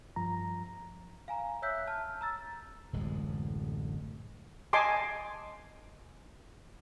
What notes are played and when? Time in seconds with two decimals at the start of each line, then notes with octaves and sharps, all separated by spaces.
0.16 G2 F3 A#5
1.28 F5 G#5 A#5
1.62 C#5 E5 E6 F#6 G6 B6
1.88 A5 F6
2.21 A#5 E6 A6
2.93 D1 A1 F#2 G#3
4.73 D#5 G#5 A5 C6 D6